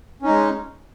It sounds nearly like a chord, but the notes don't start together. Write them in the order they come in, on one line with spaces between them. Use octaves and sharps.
C#4 D#4 G#3